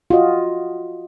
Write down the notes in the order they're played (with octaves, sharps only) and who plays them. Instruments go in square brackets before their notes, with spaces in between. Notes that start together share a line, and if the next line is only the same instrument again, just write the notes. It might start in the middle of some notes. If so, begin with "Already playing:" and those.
[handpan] F4 F#4 D#5